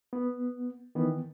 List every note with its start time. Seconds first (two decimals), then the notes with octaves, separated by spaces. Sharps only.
0.13 B3
0.95 D#3 E3 B3